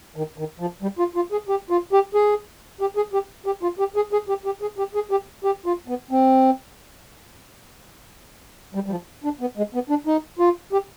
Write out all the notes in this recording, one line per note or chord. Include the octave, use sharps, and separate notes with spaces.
D#3
D#3
F3
G3
F4
F4
G#4
G4
F4
G4
G#4
G4
G#4
G4
G4
F4
G4
G#4
G#4
G4
G4
G#4
G4
G#4
G4
G4
F4
B3
C4
G3
G3
F3
D4
B3
G#3
B3
D4
D#4
F4
G4